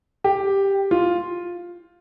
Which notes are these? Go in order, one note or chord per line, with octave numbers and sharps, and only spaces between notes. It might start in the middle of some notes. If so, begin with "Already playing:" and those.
G4
F4